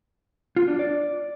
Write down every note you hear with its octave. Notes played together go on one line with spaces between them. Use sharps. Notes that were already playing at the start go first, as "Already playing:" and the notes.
F4
D4
D5